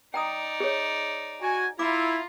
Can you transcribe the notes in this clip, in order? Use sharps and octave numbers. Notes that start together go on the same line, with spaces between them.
D#4 D5 G5 A#5 D#6
G#4 C#5
F#4 G#5
E4 F4 A#5 D6